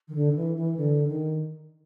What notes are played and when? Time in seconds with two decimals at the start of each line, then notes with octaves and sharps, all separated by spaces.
0.08 D#3
0.15 D3
0.32 D#3
0.36 E3
0.56 E3
0.77 D3
1.07 D#3